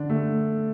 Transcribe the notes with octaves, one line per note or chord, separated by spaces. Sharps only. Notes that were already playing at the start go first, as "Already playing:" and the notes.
Already playing: D3 D4
A3